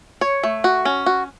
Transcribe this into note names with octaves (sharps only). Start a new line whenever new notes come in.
C#5
A3
F#4
C#4
F#4